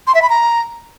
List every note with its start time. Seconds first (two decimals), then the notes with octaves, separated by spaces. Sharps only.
0.07 C6
0.15 E5
0.22 B5
0.30 A#5